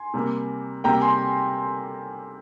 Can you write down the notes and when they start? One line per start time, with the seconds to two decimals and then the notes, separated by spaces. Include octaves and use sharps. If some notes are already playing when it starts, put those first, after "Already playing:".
Already playing: G#5 C6
0.14 C3 G3 A#3
0.84 C3 G3 A#3 G5 A#5
1.01 G#5 C6